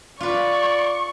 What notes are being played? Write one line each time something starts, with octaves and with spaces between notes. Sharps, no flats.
F4 B4 D5 C#6